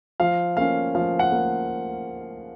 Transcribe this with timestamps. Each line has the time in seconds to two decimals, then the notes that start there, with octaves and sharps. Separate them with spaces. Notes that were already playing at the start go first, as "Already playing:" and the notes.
0.20 F3 F5
0.57 A#3 C#4 F5
0.95 F3 F5
1.19 F#5
1.32 A#3